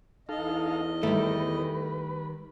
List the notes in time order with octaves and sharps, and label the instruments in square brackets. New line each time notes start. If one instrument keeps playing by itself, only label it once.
[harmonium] E2 D#5 [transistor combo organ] D#4 A4 F5
[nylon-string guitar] D#3 G3 [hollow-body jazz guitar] A3 [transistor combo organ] B4